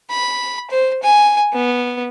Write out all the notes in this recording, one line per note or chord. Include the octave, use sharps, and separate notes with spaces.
B5
C5
G#5
B3